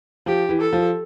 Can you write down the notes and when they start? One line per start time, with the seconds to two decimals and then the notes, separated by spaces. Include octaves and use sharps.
0.26 F3 G4
0.49 E3
0.61 A4
0.73 F3